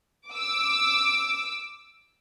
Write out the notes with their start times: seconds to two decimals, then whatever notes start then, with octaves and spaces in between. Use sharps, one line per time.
0.31 D6 E6